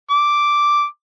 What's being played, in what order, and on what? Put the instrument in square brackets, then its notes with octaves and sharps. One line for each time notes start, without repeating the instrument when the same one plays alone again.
[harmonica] D6